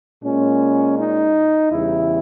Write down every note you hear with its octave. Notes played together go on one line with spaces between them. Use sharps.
A#2 G#3 C#4
D#4
E2 C#3 G3 E4